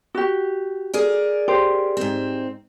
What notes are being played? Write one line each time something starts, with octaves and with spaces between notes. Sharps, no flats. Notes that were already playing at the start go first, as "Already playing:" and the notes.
F#4 G4
G#4 A#4 D5
G4 C5
G#2 C4